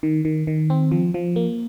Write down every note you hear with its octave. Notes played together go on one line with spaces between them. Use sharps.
D#3
D#3
D#3
C4
F3
F3
A#3